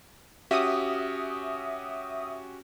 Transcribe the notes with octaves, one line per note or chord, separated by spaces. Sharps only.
C#4 F#4 G4 E5 D#6